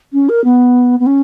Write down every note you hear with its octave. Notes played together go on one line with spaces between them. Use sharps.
C#4
A#4
B3
B3
C#4